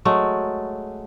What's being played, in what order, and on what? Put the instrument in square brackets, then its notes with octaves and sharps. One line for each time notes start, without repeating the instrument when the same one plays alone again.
[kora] F#3 G#3 A3